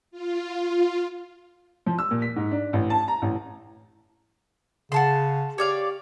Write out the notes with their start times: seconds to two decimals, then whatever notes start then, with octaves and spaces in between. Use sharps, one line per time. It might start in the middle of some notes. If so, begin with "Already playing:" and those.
0.11 F4
1.86 F3
1.99 E6
2.11 A#2
2.22 B6
2.36 G#2
2.51 D4
2.73 A1
2.90 A5
3.08 A#5
3.22 A1
4.92 C#3 F#5 A5 C6
5.58 G4 C#5 D5 F5